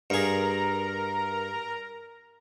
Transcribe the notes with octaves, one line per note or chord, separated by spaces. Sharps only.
G2 G#4 A#4 A#5